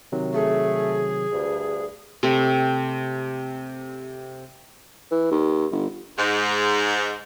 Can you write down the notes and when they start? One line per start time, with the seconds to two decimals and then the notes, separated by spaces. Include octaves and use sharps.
0.12 C3 D#3 F#3
0.34 A3 G#4
1.32 D2 G2
2.23 C3 A3
5.11 E3
5.31 D#2
5.72 G1
6.17 G#2